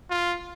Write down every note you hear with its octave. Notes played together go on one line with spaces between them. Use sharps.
F4